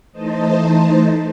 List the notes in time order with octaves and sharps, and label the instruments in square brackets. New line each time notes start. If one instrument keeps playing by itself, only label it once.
[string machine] E3 A3 D#4 C5 D#5 A5